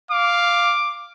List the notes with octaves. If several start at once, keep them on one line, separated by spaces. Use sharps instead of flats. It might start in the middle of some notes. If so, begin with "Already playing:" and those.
F5 D6